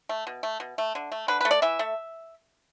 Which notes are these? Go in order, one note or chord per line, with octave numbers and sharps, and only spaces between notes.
A3
B2
A3
B2
A3
D3
A3
D3 B4
A3 B4
D5
E3 E5
A3